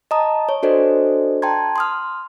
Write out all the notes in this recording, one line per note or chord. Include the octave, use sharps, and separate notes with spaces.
D#5 A5 A#5 D#6
C#5
D4 F#4 A4 C5 D5 D#5
G5 A5 A#5 C6 G#6
C6 D#6 F6